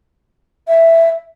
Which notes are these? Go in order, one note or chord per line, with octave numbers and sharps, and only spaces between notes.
E5